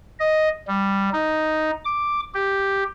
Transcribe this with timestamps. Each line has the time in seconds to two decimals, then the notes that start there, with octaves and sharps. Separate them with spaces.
0.20 D#5
0.67 G3
1.13 D#4
1.85 D6
2.34 G4